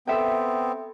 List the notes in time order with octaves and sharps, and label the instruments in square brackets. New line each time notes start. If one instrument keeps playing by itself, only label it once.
[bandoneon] B3 C4 [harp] A4 E5 G5